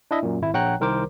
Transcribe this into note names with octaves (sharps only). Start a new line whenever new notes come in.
D4 E4 D#5 E5
F#2 A#2
G#1 E4
A#1 C#5 F#5 G5 A#5 F#6
C2 D#3 A#4 C5 D6